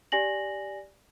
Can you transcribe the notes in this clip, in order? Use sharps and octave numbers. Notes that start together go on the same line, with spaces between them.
G4 D5 G#5 A#6 F#7